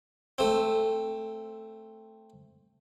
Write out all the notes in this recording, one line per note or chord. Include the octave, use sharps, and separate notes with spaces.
A3 C4